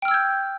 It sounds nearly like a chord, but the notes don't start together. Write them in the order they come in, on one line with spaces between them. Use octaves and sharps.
G5 F6 E6 G#6 G6